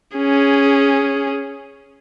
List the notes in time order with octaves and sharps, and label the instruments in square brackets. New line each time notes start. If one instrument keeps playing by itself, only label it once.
[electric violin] C#4 G#4